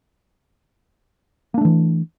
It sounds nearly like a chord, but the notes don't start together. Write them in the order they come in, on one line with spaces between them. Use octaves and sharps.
A#3 D4 A3 E3